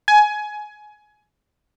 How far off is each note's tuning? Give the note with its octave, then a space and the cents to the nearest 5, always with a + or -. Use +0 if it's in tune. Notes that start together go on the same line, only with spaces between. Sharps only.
G#5 +20